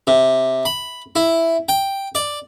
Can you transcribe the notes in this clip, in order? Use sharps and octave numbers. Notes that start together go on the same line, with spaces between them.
C3
B5
E4
G5
D5